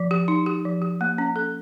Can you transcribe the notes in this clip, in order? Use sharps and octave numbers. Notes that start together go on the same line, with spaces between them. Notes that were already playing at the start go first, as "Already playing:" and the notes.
Already playing: F3
G4
D#4
G4
F3
G4
A#3
C#4
A4